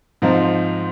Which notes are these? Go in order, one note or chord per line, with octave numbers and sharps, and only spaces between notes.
G#2 F3 C4 D#4